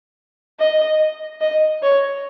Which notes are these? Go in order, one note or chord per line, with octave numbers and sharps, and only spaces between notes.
D#5
D#5
C#5